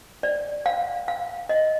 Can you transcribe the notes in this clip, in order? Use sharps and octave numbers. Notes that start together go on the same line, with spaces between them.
D5
F5
F5
D#5